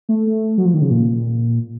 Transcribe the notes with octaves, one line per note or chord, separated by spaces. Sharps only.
A3
F#3
F3
D#3
C#3
A#2